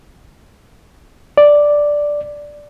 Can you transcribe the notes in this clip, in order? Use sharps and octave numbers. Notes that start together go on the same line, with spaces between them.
D5